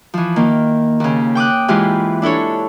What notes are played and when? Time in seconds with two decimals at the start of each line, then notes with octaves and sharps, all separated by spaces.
0.14 E3 F3
0.36 D#3 A#3
1.00 D#2 C#3
1.35 G5 D6 D#6 F#6
1.68 G#2 E3 G#3 E4 F4 G4
2.22 D4 E4 A4 C#5